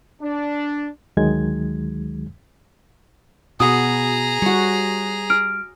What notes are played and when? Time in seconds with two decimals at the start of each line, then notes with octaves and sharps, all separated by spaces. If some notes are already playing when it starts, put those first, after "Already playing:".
0.22 D4
1.17 D2 D#3 F#3 G#3 G#6
3.60 B2 B3 F#4 G#4 A#5 D#6
4.42 G3 F#4 C#5
5.30 F6 D7